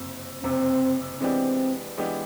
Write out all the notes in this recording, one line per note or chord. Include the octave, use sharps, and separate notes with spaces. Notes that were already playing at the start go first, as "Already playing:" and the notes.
Already playing: F#1 F2 C3
F#1 F2 C3 C4
E3 G#3 B3 C4 D4 G4
E3 G#3 B3 D4 G4